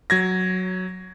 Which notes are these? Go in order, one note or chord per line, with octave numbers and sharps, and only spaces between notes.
F#3 G#6 A#6